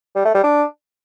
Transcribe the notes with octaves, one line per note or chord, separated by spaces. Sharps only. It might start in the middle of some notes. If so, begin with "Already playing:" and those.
G3
A3
G3
D4